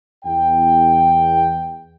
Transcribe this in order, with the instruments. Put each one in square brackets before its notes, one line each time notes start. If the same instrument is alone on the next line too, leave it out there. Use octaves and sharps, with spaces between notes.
[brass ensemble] E2 G5